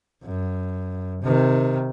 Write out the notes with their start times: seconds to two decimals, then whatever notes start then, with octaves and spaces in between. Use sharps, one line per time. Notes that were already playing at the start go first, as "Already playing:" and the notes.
0.23 F#2
1.22 C3 D#3